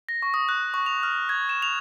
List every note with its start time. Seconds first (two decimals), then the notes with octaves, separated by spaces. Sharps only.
0.09 A#6
0.22 C#6
0.34 D#6
0.49 F#6
0.74 C#6
0.86 F7
1.03 F6
1.29 G#6
1.49 E7
1.62 F7